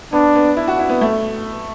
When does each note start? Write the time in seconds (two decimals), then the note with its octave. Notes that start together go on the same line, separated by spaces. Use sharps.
0.13 B3 D4
0.36 B3
0.57 E4
0.68 F#4
0.79 E4
0.90 B3
1.01 A3